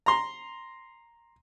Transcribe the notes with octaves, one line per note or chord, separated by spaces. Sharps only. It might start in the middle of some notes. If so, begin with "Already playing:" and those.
A#5 C6